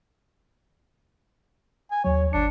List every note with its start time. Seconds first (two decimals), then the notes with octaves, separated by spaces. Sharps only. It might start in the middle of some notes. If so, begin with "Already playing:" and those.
1.91 G#5
2.05 D#2 F#3 C#5
2.33 G1 D4 C#7